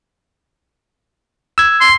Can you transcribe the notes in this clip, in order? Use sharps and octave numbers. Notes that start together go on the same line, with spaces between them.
E6 G#6
C6